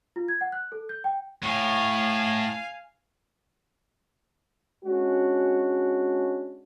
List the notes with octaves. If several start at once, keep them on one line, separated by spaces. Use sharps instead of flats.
F4
G#6
F#5
F#6
A4
G6
G5
A2 F5 G#5
G#3 C#4 D4 F#4